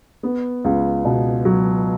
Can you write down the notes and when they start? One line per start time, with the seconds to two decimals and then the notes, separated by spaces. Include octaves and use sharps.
0.23 B3
0.64 C#2
1.05 B2
1.45 F#3